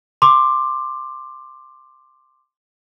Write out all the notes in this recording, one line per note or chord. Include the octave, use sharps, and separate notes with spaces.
C6 D6